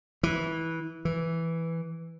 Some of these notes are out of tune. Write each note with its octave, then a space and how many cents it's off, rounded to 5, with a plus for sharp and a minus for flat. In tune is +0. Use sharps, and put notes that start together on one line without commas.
E3 -15
E3 +0